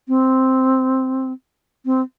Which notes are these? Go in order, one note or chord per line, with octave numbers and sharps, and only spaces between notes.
C4
C4